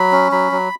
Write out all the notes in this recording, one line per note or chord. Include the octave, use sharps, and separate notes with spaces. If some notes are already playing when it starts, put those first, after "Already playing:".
Already playing: F#3 B5
C#4
F#3 B5
F#3